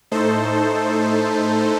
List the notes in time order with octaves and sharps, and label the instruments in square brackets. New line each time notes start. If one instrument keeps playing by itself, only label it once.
[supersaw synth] A2 A3 D#4 A4 C5